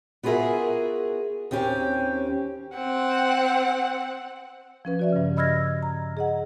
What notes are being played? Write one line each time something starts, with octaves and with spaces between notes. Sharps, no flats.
B3 F4 F#4 G#4 A#4 E5
D#2 C4 C#4 G4
C4 F#5
F3 C#4 B4
F#4 D5 E5
G2 C#3
D#5 B5 E6 F6 G#6 A#6
A#5
G#4 D#5 F#5